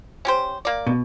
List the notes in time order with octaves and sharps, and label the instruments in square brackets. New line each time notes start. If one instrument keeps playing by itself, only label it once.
[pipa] C#4 G4 C5
A#3 D5
[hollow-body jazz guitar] B2